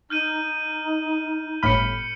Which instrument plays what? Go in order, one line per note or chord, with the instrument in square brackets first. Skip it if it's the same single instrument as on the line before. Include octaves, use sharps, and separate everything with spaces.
[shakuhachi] D#4 [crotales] F6 G6 D#7
[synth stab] G1 A2 B5 [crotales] F6 C#7